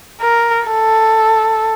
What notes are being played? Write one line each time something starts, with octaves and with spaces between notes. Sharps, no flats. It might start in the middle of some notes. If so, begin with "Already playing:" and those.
A#4
A4